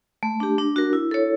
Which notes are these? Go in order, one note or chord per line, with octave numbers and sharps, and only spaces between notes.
A3
D4 G4
D4
F#4 A#4
E4
A4 C#5